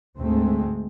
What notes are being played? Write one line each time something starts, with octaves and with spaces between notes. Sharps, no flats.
D2 G#2 G#3 A3 C4